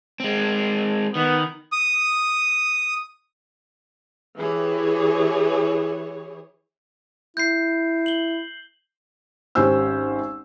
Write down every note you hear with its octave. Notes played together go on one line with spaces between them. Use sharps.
G#3 C4
D#3 B3
D#6
E3 G4 G#4 C#5
E4 G6 C7
F#7 G7
G#1 C#4 G4 C5 E6